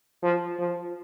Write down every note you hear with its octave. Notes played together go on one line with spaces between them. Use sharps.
F3
F3